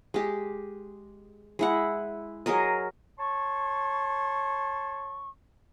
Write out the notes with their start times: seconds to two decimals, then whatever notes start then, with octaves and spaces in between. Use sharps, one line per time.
0.14 G#3 G4
1.59 G#3 E4 F#5
2.46 F#3 G#4 A#4 D#5
3.18 C#5 A5 C6 C#6